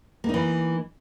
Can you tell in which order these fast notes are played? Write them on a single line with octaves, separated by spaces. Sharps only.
A#3 D#4 E3